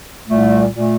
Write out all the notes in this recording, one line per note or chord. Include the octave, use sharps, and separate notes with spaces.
C2 A#2 A3
A#2 A3